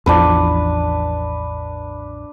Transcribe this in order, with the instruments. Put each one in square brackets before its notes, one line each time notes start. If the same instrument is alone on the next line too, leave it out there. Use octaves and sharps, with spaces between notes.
[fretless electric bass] A1 E2 F3 [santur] D4 B4